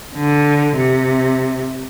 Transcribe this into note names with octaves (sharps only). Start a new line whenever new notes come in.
D3
C3